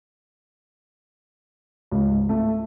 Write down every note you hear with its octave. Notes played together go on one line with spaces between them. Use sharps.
C#2
G#2
A3